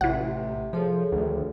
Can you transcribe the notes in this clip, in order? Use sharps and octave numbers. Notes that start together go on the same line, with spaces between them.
A1 C3 E3 F#5
F3 G#4 A4 C#5
D2 D#3